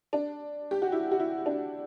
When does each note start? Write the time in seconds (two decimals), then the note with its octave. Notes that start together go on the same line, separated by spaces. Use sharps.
0.13 D4
0.71 G4
0.82 F#4
0.92 E4
1.12 F#4
1.20 E4
1.46 D4